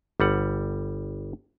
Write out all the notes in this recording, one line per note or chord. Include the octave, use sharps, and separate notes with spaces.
G1 G3 F#5